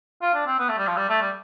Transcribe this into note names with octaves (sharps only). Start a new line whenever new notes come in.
F4
D4
C4
B3
A3
G3
F3
G3
A3
G3